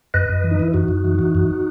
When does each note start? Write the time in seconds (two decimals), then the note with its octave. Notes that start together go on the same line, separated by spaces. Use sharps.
0.14 F#2 B4 D#5
0.29 F#2
0.44 E3
0.51 D#4
0.60 E3 E4
0.74 F#2 D#4 F#4
0.88 F#2
1.04 E3
1.19 E3
1.35 F#2